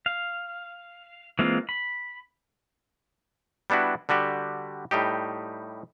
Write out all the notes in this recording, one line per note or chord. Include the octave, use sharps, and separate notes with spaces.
F5
E3 G#3 A#3 C4 F4
B5
G3 B3 D4 E4 F#4
D3 G3 F#4 G4
A2 G3 D#4 G4